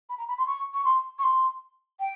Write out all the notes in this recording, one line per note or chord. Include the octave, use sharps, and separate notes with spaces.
B5
A#5
B5
C6
C#6
C#6
C6
C#6
C6
G5